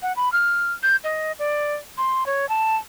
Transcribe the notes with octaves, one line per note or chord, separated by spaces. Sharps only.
F#5
B5
F6
G6
D#5
D5
C6
C#5
A5